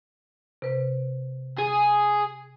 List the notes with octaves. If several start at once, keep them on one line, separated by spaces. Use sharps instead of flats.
C3 B4
G#4